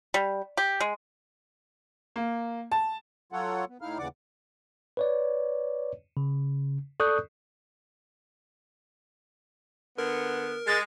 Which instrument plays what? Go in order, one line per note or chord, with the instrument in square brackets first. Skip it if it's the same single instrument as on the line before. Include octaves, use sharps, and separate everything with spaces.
[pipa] G3
G4
G#3
[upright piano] A#3
A5
[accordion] F#3 F4 A4 C#5 F#5
B3
A2 D#4 E4 F5 F6
D#2 C#3 E3 D5 F#5 D6
[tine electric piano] B4 C#5 D5
C#3
A4 D5 C#6 D#6 F#6 G6
[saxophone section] D3 B3 [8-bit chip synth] A#4
[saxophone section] G#3 [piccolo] A6